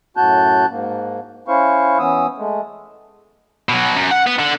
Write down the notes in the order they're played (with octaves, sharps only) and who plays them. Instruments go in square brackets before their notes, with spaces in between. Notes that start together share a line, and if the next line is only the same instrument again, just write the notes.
[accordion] F#2 A2 F#4 A5 F#6 G6
G#2 A#3
C#4 E4 C5 F5 C#6
E3 B3 C#4 D#6 E6
G#3 A3
[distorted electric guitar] B2 F#3
F#2
F#5
B3
D3